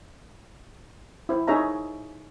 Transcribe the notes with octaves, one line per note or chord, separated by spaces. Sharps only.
E4 C5
D#4 G#4 C#5 E5 A#5